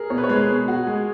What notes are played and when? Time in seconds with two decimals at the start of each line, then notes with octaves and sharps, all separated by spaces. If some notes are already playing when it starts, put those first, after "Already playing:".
Already playing: G#4 A#4
0.10 B2 C#5
0.18 B4
0.24 C#5
0.29 G#3
0.36 B4
0.49 B2
0.68 F#4
0.87 G#3